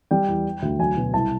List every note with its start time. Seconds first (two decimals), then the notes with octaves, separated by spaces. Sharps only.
0.11 G3 G5
0.28 E2
0.46 E3
0.62 D2
0.79 F#3 G#5
0.97 B2
1.14 C2 A5